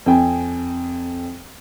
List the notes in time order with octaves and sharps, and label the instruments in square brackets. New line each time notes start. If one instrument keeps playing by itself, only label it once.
[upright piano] F2 G5 G#5